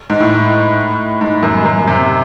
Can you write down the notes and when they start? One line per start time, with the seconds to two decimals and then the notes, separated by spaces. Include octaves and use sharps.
0.10 G#2
0.20 A2
1.21 G#2
1.43 F#2
1.65 F#2
1.87 C3